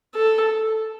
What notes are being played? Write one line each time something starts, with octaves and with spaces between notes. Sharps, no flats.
A4